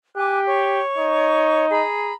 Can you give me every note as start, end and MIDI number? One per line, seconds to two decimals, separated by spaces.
0.17 0.81 67
0.17 0.39 80
0.17 0.39 86
0.17 0.39 90
0.46 1.65 73
0.46 1.65 85
0.98 1.83 63
1.71 2.14 68
1.71 2.14 82
1.71 2.14 83